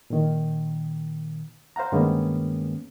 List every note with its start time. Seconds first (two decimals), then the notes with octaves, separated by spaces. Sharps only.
0.10 A#2 D#3
1.76 C5 F5 F#5 A#5
1.92 G2 D#3 G#3 A#3 B3 C#4